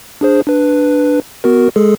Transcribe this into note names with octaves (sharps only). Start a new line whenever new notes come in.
D4 G#4 C5
D4 B4
B3 F#4 A#4
G#3 G#4 A4